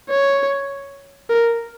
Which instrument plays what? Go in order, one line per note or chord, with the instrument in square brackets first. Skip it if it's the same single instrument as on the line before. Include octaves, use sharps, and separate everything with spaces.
[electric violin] C#5
A#4